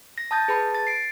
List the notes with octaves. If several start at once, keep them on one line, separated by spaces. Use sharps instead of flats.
A#6
A5 D#6 G6 A6
G#4 B4 A5 B5
A6
C7 D7